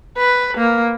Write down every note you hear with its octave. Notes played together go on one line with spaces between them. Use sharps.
B4
A#3